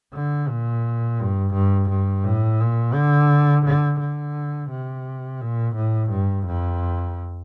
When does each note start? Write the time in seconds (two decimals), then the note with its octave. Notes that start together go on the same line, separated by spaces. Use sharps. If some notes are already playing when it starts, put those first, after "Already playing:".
0.14 D3
0.49 A#2
1.19 G2
1.54 G2
1.89 G2
2.24 A2
2.60 A#2
2.94 D3
3.65 D3
4.00 D3
4.70 C3
5.41 A#2
5.75 A2
6.10 G2
6.46 F2